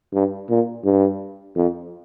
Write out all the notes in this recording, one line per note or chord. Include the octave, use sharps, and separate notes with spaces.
G2
A#2
G2
F2